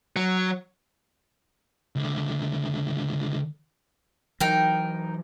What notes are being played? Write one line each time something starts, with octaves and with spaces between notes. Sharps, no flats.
F#3
C#2 D3
E3 F#3 D#4 A#4 G5